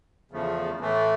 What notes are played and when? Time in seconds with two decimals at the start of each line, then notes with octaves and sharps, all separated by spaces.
0.31 E2 C#3 F3 A3
0.80 A2 E3 A3